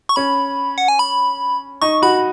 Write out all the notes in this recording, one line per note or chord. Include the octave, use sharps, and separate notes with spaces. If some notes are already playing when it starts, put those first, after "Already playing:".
C#6
C#4 B5
F#5
G#5
B5
D#4 C#6
F#4 B5